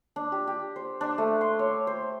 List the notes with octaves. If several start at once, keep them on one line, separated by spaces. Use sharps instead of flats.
D4
G4
G4
C5
D4
A3
C6
C#5
C5